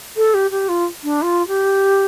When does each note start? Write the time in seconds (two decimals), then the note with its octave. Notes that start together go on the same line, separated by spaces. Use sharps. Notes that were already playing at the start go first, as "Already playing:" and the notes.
0.17 A4
0.34 G4
0.51 G4
0.68 F4
1.03 D4
1.22 F4
1.47 G4